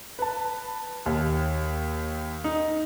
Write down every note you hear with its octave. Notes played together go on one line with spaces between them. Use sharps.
B4 A5
D#2
D#4